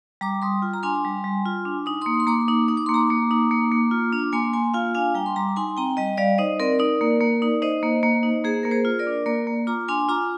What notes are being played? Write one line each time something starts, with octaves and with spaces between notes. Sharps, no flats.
G3 A#5 D6
G3 C6 D#6
F4
A#5
D4 G#5 C6
G3
G3
F4
D4
D#4 D#6
A#3 C6 D#6
C6
A#3 A#5 D6
D#4
D#4 D#6
D6
A#3 C6
A#5 D6
A#3
D#4
A#3
A#3
F4
D4
A#3 G#5 C6
A#3 G#5 C6
F4 F5 G#5
D4 F5 G#5
G3 G5 A#5
C6
G3 A#5 D6
D#4 G#5 C6
C4 G5 A#5
G3 D#5 G5
G3 D5 F5
D#4 C5 D#5
C4 A#4 D5
D#4 A#4 D5
A#3
A#3
D#4
D#4 C5 D#5
A#3
A#3
D#4
A#3 G#4 C5
A#3 A#4
G#4 C5
F4
A#4 D5
D4
A#3 A#4 D5
A#3
F4 A#5 D6
D4 G#5 C6
F4 A#5 D6